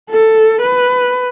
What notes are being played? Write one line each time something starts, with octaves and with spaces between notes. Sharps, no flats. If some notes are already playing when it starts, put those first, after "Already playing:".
A4
B4